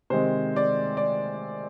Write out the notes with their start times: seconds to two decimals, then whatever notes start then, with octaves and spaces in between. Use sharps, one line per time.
0.10 C3 D#3 G#3 C4 C5
0.56 D5
0.97 D5